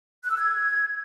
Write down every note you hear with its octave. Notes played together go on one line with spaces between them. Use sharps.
F#6
E6
G#6